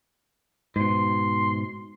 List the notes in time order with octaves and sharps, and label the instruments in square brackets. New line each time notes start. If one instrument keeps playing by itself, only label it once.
[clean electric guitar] G#2 B2 [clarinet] C6